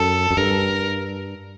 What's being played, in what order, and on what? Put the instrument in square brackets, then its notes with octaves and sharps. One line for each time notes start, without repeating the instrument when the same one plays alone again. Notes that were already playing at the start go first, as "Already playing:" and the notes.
Already playing: [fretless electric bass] F#2 [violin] A4
[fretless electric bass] F#2
[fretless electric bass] G2 [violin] A#4